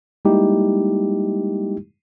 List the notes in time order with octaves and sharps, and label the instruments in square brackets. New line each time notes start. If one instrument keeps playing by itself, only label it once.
[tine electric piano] G3 G#3 A#3 D#4 E4 G4